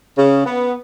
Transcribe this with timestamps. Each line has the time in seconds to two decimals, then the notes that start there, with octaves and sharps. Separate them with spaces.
0.17 C#3
0.46 B3